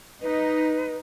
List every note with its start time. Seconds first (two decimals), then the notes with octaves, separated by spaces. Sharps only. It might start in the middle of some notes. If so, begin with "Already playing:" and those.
0.21 D#4 B4